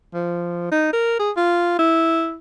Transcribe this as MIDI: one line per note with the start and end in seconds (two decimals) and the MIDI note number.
0.14 0.67 53
0.72 0.91 63
0.93 1.19 70
1.19 1.31 68
1.37 1.78 65
1.79 2.37 64